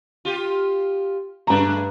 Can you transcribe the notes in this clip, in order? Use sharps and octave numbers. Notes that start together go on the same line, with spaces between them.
F4 G4
G2 G#3 A3 D4 A#5